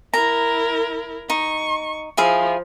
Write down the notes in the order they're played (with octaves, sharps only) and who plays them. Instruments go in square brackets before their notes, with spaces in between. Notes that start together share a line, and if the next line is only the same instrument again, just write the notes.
[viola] E4 A#4 [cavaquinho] A#5
[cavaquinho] D#4 [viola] C#6
[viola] F3 [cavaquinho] E4 G#4 F5